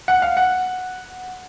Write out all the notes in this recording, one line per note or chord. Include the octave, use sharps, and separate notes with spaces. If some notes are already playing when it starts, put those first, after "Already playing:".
F#5
F5
F#5